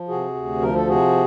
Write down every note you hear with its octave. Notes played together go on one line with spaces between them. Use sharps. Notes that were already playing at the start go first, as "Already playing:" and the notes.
Already playing: F3
C3 F#4 G#4
D2
F3 A#4
A4
C3 F#4 G#4